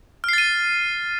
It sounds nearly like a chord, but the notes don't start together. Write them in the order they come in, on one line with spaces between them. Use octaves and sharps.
F6 C7 A6 D#7